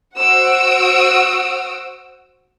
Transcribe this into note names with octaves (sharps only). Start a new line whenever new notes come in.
F#4 C5 F#5 E6 D7